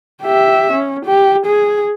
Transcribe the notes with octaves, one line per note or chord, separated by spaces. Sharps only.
G4 E5
C#4
G4
G#4